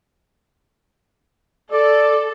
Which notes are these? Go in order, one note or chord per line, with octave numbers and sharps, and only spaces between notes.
A4 D5